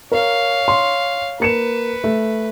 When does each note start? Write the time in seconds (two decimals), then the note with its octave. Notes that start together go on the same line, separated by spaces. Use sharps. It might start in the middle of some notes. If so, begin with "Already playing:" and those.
0.12 A#4 C#5 F5
0.68 C6
1.40 A#3 B4 C#7 E7
2.04 A3